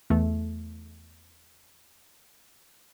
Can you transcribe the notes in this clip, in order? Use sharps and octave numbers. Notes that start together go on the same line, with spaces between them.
E2 A3